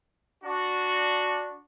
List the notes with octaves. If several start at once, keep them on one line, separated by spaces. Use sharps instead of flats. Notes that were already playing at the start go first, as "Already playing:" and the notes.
D4 F#4